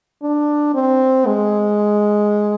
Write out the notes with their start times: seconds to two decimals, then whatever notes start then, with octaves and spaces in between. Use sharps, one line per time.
0.22 D4
0.75 C4
1.27 G#3